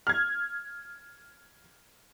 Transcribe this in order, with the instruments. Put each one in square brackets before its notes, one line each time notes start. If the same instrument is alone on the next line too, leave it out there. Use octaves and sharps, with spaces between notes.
[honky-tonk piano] F6 G#6